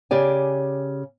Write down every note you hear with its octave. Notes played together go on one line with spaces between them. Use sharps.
C#3 G4 D5 G#5